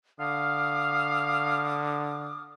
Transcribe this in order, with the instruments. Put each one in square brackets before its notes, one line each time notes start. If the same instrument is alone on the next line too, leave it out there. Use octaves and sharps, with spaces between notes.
[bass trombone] D3 [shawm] F5 [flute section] D6 D#6 F6